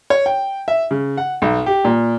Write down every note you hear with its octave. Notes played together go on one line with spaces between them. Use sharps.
C#5
G5
E5
C#3
F#5
B1
G4
A#2